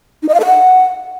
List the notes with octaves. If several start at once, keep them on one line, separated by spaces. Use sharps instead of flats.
D#4
D#5
F5
A4
F#5